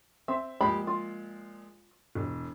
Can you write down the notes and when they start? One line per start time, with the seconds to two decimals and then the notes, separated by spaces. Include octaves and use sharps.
0.28 C4 E5
0.61 A#2 F3 G#3 G4 B5
0.87 F4
2.15 E1